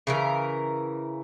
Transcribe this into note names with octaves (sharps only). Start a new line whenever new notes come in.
C#3 E3 A#4